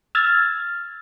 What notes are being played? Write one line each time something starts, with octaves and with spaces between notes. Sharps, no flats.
E6 F6 G#6 A6